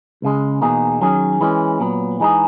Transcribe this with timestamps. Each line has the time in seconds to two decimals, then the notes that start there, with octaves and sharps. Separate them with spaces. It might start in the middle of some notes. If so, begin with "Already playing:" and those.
0.22 C#2 C#3 G#3
0.62 E2 B2 A#3 D#4 G#4
1.01 D#3 F#3 C#4 G#4
1.41 E3 G#3 C#4
1.80 A#2 F#3 B3
2.20 E3 G#3 D#4 G#4